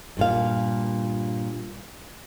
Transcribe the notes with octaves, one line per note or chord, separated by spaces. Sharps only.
G2 A#2 F5